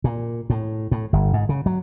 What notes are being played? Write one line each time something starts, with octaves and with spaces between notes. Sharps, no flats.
A#2
A2
A2
G1
G#2
C#3
F#3